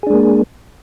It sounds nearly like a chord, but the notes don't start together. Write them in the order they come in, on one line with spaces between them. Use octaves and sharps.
G#4 D4 G#3 A#3